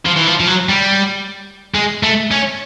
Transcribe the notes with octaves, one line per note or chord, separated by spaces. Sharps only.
F3
E3
F3
F3
F#3
G3
G#3
A3
C#4